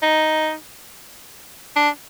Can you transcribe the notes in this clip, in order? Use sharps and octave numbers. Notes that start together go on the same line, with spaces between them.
D#4
D4